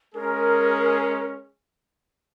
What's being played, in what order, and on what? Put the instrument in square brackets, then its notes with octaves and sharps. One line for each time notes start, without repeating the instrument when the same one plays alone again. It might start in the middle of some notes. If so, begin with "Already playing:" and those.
[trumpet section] G#3 C#4 G#4 [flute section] A#4